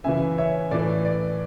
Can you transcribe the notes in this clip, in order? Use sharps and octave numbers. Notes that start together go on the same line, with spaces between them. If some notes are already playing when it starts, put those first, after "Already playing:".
F#2 C#3 E3 E5 G#5
C#5 E5
A2 E3 D5
D5